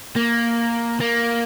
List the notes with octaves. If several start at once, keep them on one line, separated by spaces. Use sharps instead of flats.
A#3
A#3